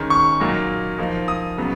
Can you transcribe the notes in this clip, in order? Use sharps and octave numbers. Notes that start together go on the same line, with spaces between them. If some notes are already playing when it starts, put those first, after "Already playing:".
Already playing: D#3 G#3 C#4
C#6
A#2 F#3 A#3 D#4
F3 A#3 D#4
D#6
C#3 F#3 B3